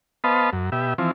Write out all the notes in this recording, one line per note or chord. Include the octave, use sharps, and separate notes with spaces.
B3 B4 C5 D#5 F5 A5
F#2
B2 G4 E5
E3 F3 C4